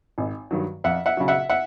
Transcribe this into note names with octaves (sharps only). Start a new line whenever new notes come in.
G#1
G2 D#3 F#3
F2 E5 F#5
E5 F#5
C#3 F#3
E5 F#5
E5 F#5